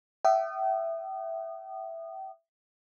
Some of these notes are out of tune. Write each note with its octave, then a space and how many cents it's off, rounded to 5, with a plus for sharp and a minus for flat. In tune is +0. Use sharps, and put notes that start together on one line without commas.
E5 +5 G5 -40 D#6 -25